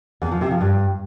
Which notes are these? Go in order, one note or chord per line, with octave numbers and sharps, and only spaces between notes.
E2
F3
C3
F3
G2